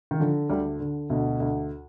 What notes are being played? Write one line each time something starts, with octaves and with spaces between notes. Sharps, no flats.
D#3
D3 F3
D2 G3
D3
D2 B2
D2